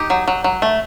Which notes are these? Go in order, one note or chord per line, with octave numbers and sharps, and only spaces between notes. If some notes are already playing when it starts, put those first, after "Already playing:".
Already playing: D#4 G4
F#3
F#3
F#3
A3